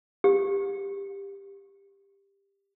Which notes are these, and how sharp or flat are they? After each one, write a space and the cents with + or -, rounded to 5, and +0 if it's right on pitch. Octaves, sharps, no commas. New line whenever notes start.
G4 +15